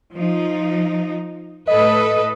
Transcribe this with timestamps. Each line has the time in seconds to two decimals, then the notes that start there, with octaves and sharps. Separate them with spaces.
0.15 F3 D#4
1.67 A2 A4 B4 D#5